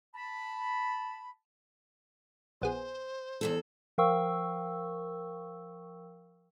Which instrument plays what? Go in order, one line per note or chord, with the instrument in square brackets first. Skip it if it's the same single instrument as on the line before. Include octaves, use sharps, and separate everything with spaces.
[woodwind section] A5 B5
[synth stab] A#1 B3 G#4 [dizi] C5
[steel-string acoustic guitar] E2 G2 A4
[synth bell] F3 A#4 F5 G5 C#6 E6